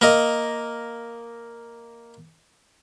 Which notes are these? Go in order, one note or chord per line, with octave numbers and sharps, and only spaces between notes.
A#3 A#4 D#5